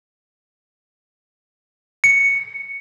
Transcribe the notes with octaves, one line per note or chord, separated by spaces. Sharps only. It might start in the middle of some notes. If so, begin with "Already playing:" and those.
C#7